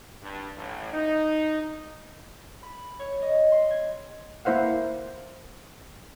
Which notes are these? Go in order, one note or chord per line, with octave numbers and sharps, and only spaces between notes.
G2
A1
D#4
B5
C#5
D#5
C6
G#6
A#3 E4 C5 F5 F#5